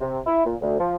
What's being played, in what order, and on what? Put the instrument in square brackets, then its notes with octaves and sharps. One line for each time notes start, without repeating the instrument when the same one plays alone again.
[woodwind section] C3
E4
A#2
D2
F3